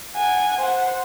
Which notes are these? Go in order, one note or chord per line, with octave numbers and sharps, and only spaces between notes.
F#5 G#5
C5 F#5